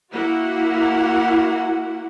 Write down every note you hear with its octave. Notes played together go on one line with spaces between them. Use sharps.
A#3 E4 F#4 F#5